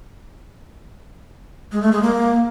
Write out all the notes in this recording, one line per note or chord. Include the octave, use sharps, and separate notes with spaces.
G#3
A3
G#3
A#3